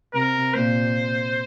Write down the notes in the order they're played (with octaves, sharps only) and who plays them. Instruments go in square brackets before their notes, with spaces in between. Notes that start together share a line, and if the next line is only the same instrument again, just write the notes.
[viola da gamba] C3 [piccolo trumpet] A#4
[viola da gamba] A#2 [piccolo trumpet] C5